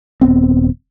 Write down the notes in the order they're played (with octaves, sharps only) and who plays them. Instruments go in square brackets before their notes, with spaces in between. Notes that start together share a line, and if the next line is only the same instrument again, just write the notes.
[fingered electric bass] D#1 G2 B3 C4